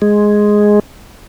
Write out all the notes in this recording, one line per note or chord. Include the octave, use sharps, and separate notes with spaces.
G#3